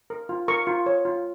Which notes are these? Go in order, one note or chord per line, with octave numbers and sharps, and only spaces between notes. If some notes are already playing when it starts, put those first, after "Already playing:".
A#4
F4
A#4 C#6
F4
C#5
F4